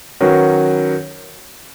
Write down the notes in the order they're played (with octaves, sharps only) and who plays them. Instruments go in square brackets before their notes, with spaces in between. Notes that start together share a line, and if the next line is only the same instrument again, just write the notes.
[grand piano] D#3 F#3 C#4 F#4 B4